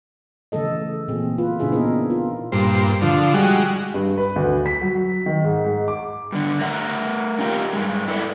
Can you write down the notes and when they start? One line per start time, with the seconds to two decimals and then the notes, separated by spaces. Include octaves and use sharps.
0.52 C#3 E3 A3 A4 D#5
1.08 A#2 E3 C4 G#4
1.38 F4 B4
1.59 A#2 C#3 D4 E4 G#4 E5
1.72 B3 C4 D#4 G#4 A#4
2.10 F4
2.52 G2 A#2 C5
3.02 D3 F3
3.34 G3 G#3 F#4
3.94 G2
4.18 B4
4.36 D2
4.66 B6
4.82 F#3
5.26 D#3
5.44 G#2
5.64 G#2
5.88 D6
6.32 G2 D3
6.61 A3 A#4 E5 F#5
7.39 C#4 D#4 F4 G4 A#4
7.73 G2 G#3
8.08 E4 A4 B4 C#5 D5 E5